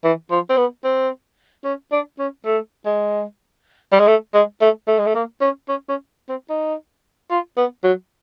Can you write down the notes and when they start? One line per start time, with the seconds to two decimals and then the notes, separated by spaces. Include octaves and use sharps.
0.04 E3
0.31 F3
0.50 C4
0.57 B3
0.84 C4
1.65 C#4
1.92 D4
2.19 C#4
2.46 A3
2.86 G#3
3.92 G3
3.99 G#3
4.07 A3
4.34 G#3
4.61 A3
4.88 A3
4.99 G#3
5.06 A3
5.15 A#3
5.41 C#4
5.69 C#4
5.89 C#4
6.29 C4
6.50 D#4
7.31 F4
7.57 B3
7.84 F#3